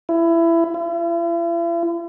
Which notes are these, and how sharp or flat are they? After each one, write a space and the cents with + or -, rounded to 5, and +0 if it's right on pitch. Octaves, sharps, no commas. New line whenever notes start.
E4 +20
E4 +45